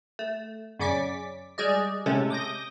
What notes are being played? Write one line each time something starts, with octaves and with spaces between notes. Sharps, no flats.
A3
F#2 C#3 C#4 D5 D6 B6
G3 G#3 G#4 D5 D#5
A2 C3 G#3 A3 C#4 A4
D6 D#6 G6 A#6